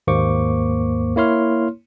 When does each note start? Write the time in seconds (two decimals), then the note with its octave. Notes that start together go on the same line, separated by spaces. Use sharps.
0.07 D#2 G#2 A#3 C5 C#6 D6
1.16 A#3 E4 C#5 C6 F6